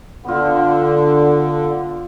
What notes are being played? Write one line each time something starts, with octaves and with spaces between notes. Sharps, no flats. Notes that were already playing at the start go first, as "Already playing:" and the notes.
D3 B3 F4